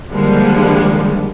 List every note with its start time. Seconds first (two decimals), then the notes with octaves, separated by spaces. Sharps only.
0.11 D3 D#3 F3 G3 G#3 A#3